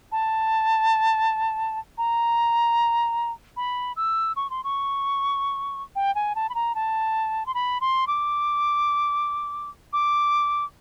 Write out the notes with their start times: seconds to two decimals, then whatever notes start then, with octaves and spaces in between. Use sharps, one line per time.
0.12 A5
1.98 A#5
3.57 B5
3.96 E6
4.36 C#6
4.50 C6
4.64 C#6
5.96 G5
6.15 G#5
6.35 A5
6.49 B5
6.55 A#5
6.75 A5
7.46 C6
7.54 B5
7.81 C6
8.07 D6
9.93 D6